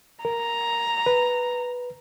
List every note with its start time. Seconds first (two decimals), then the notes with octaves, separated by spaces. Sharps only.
0.25 A#4 A#5
1.06 B4